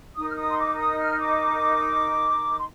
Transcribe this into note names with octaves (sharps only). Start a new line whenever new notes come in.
D#4 A#4 D#6
F6
D#6
C6
D6
D#6
F6
D6
C6